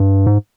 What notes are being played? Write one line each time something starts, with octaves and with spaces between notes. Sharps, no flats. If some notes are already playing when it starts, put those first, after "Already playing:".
Already playing: G2
G#2